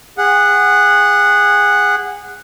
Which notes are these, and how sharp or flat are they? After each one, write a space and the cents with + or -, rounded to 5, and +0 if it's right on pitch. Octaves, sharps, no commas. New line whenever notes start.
G#4 -25 F#5 +0